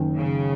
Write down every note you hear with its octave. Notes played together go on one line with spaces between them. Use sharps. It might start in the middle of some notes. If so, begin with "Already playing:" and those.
Already playing: F#1 F#2 D#3
C#3